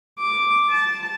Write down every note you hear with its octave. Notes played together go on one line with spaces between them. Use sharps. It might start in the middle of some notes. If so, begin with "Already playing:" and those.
D6
A5